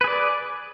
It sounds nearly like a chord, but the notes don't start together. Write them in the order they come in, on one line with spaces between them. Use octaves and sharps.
B4 G#4 D5